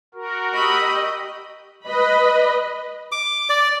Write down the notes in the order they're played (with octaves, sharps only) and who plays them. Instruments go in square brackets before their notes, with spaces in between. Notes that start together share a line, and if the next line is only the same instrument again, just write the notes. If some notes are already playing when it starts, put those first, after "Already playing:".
[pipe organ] F#4 A#4
[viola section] G4 D#5 [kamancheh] B5 [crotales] C#6 E6
[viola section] B4 D#5 B5
[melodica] D6
D5